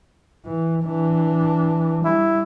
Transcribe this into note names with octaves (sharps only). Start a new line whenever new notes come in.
E3
E3 D4
G3 E4